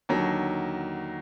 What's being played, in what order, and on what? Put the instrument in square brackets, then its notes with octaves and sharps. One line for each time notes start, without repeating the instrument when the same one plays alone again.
[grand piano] D#2 D3 F#3